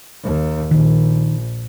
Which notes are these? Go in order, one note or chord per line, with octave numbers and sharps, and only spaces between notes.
D#2
A#1 D#3